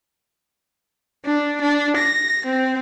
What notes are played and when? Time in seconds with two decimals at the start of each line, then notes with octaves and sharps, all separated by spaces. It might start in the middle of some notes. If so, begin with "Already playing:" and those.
1.25 D4
1.61 D4
1.97 A#6
2.46 C4